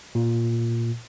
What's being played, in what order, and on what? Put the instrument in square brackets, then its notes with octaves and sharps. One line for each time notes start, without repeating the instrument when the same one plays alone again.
[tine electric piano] A#2